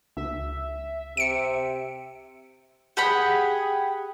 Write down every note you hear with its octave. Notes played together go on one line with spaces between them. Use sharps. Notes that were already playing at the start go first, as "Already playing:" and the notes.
C#2 E5
C3 C#7 D7
G4 G#4 F#5 B5